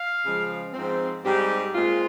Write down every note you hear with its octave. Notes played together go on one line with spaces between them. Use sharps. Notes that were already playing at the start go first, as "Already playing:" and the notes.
Already playing: F5
C#3 F3 G#3
G#2 F3 C4
G#2 G3 C4 G4
A#2 G#3 C4 F4